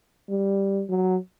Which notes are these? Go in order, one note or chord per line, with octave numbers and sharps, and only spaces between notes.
G3
F#3